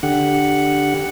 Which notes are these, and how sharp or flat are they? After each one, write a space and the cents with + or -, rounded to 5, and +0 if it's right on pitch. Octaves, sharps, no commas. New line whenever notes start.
D3 +0 G4 +0 F#5 +0